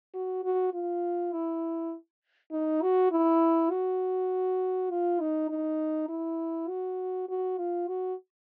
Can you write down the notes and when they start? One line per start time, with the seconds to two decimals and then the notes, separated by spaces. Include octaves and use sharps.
0.14 F#4
0.44 F#4
0.74 F4
1.32 E4
2.52 D#4
2.82 F#4
3.11 E4
3.71 F#4
4.90 F4
5.20 D#4
5.49 D#4
6.09 E4
6.68 F#4
7.29 F#4
7.58 F4
7.88 F#4